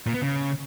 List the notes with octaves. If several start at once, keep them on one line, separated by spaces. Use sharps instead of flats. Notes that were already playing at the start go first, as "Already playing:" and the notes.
A#2
B3
C#3